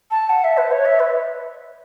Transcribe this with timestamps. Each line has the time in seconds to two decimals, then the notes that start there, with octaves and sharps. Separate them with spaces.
0.11 A5
0.29 F#5
0.44 E5
0.57 B4
0.71 C#5
0.85 E5
0.99 B4